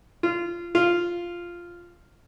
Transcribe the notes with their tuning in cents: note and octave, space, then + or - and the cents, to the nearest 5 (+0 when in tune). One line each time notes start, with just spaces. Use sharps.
F4 -20
F4 -5